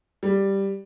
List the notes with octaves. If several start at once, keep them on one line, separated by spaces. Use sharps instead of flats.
G3